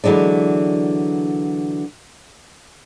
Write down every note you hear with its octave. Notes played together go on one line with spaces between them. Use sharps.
D3 E3 F#3 G#3 D4